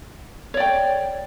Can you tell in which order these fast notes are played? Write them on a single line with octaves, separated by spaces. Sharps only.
C#5 D5 G5